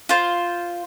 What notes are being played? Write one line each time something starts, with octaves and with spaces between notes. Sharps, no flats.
F4 C5